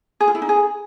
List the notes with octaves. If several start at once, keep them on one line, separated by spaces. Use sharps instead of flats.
G#4
F4
E4
D#4
G#4